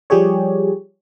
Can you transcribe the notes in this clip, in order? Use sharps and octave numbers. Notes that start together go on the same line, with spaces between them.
F3 G3 G4 G#4 C#5